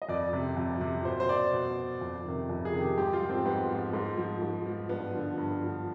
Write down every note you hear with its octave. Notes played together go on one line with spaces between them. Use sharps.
D#5
F2 D5
C3 F3
F2
C3 F3
B2 C5
C5
D5
B2
F2
C3 D#3
F2
G#4
C3 D#3
G4
G#2 G4
F4
F3
C4
G#2 B3
F3
G#2
F3
G#2
F3
G2 B3
D3 F3
G2
D3 F3